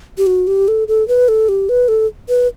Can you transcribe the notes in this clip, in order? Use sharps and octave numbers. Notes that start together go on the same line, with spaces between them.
G4
F#4
G4
A4
A4
B4
A4
G4
B4
A4
B4